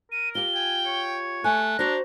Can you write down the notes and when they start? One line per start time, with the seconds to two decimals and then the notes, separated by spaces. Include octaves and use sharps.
0.12 A#4 D#7
0.35 F4 G4 G7
0.55 G5 G#5
0.86 C#5
1.44 A3 G#5 F#6
1.79 D4 F#4 C5 A#5